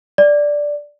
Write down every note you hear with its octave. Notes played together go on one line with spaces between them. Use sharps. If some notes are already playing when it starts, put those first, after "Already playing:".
D5